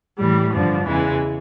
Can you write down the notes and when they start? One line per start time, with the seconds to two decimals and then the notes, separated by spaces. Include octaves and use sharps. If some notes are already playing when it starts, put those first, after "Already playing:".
0.18 A2 E3 G3
0.53 G2 D3 F3
0.86 E2 C#3 E3 G#3